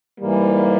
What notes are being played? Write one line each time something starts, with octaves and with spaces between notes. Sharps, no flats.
G#2 E3 G3 A#3